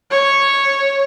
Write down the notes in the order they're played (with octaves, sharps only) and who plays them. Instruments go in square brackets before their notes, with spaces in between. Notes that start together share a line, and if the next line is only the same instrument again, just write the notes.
[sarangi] C#5